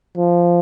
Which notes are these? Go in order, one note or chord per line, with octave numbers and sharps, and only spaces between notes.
F3